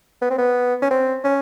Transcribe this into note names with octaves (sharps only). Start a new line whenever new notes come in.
B3
C4
B3
C#4
C4
C#4